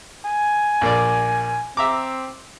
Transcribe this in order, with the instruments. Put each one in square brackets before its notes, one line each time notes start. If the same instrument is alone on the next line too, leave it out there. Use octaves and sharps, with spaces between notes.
[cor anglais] G#5
[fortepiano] A#1 A#3 D5
[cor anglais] C4 [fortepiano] E5 A#5 D6